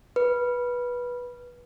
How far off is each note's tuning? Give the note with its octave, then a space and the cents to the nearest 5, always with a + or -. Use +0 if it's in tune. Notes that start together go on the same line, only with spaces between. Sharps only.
B4 -15